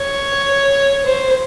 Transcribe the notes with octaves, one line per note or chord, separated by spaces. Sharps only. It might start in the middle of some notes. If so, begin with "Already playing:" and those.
Already playing: C#5
C5